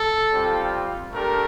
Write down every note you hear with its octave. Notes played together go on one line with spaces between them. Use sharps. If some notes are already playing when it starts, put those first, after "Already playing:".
Already playing: A4
G3 C4 F4
A3 D4 G4 A#4